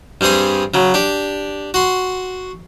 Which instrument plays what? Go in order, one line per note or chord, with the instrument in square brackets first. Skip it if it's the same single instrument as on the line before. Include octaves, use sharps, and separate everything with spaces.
[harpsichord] G2 G3 C4 G#4 D#6
C#3 F#3
D4 G4
F#4 C6